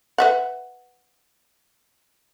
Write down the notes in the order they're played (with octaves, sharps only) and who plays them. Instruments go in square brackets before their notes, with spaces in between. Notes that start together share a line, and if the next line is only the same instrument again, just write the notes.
[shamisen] B4 E5 F#5